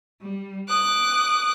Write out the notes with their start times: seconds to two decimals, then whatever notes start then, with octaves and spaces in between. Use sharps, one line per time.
0.21 G3
0.68 D6 D#6 F#6